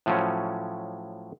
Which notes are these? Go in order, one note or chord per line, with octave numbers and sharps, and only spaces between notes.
A2 F3 F#3 C#4